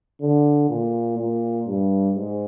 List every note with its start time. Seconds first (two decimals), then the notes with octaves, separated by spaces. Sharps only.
0.21 D3
0.69 A#2
1.17 A#2
1.66 G2
2.14 G#2